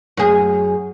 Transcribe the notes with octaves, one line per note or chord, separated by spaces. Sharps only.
F#2 G#4